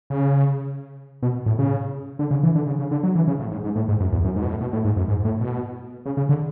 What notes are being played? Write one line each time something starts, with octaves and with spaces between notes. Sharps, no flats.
C#3
B2
A2
C#3
D3
C#3
E3
D3
C#3
C#3
D3
F#3
E3
C#3
A2
G#2
G#2
A2
G#2
F#2
E2
F#2
G#2
B2
A2
B2
A2
G#2
F#2
G#2
A2
B2
C#3
C#3
D3